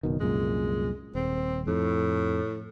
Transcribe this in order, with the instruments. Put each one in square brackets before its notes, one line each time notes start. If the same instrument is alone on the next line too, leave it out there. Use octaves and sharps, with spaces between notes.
[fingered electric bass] F#1 B2 D#3
[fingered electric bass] C2 F#2 A#2 [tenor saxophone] G#3
[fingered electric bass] D#1 [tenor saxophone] C4
[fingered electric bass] F2 [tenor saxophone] A2